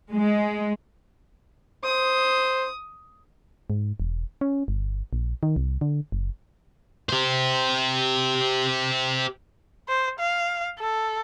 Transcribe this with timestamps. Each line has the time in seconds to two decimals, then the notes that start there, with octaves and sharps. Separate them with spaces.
0.12 G#3
1.84 C5 D#6
3.70 G#2
4.00 E1
4.41 C#4
4.68 G1
5.13 A#1
5.43 D#3
5.56 C2
5.81 D3
6.12 F#1
7.09 G4 C5
9.89 C5
10.19 F5
10.79 A4